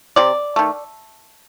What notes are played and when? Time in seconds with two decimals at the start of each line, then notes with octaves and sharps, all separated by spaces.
0.16 C3 D5
0.56 D#3 A3